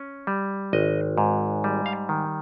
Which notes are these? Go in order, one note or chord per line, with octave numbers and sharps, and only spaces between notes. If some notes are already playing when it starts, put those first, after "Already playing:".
Already playing: C#4
G3
G#1 D#5
G#2
G3
F5
D#3